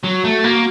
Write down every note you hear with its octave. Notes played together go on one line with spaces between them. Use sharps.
F#3 F#4
A3
A#3